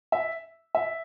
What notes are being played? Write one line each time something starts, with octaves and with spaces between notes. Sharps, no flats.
E5
E5